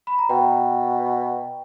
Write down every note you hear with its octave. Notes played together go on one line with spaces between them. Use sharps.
B5
A#5
B2 G5